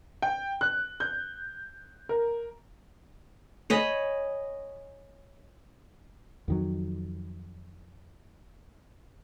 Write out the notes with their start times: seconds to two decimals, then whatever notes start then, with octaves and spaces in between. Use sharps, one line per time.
0.22 G5
0.61 F#6
1.00 G6
2.09 A#4
3.70 C#5 D#5 G#5 B5
6.48 F2 D#3 F#3